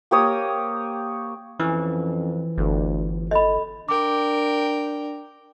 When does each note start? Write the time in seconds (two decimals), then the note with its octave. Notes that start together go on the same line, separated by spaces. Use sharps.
0.11 A#3 G4 C#5 D#6
1.60 F2 E3 C#4
2.58 G1 D2
3.31 A4 D#5 B5
3.89 D4 A#4 G5 D6